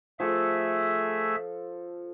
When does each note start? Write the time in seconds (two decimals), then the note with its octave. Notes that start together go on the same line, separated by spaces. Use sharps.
0.20 F3 A3 G#4 A4 E5